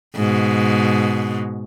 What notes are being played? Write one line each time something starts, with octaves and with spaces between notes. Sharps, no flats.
G#2 B2